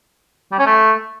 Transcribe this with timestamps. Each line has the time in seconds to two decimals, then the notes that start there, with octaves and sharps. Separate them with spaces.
0.52 G3
0.59 C#4
0.66 A3